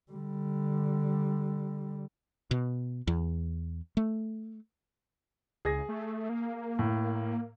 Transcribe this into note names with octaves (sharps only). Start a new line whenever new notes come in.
D3 G3
B2
E2
A3
C#2 G#4 G#6 A#6
A3
A#3
A2